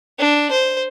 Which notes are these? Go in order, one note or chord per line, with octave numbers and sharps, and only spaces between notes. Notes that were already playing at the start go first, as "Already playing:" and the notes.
D4
C5